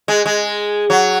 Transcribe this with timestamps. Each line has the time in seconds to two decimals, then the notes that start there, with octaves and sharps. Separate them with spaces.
0.08 G#3
0.26 G#3
0.90 F#3